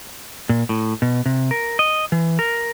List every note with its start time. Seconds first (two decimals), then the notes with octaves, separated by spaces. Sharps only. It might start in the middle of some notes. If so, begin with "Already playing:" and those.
0.49 A#2
0.69 A2
1.02 B2
1.26 C3
1.51 A#4
1.79 D#5
2.12 E3
2.39 A#4